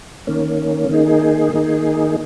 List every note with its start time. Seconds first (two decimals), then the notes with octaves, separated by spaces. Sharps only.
0.27 D#3 A#3 C#4
0.89 D#3 A#3 D#4 G#4
1.53 D#3 A#3 D#4 G#4